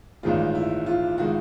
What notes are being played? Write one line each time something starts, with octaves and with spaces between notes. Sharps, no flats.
A1 G2 D#3 G#3 F4
E4
F4
D#3 G#3 F#4